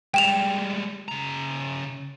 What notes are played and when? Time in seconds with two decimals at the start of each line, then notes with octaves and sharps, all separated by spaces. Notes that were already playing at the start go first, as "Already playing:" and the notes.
0.14 G3 G#3 G5 E7 F7
1.08 C#3 A#5